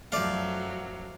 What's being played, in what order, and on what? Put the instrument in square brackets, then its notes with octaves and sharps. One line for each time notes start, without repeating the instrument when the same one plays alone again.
[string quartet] F#2 F#3 [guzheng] F3 A3 [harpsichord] D5 F5